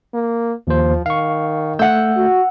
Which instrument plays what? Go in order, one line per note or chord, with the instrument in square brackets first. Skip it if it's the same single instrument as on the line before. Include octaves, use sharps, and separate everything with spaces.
[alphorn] A#3
[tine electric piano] D#2 C5 [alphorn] F3
[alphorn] D#3 [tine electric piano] F5 C#6
[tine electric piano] A3 G6 [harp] F#5 E6
[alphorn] F#4